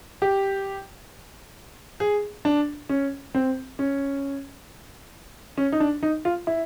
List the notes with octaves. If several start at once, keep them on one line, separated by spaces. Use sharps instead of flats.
G4
G#4
D4
C#4
C4
C#4
C#4
D#4
D4
D#4
F4
E4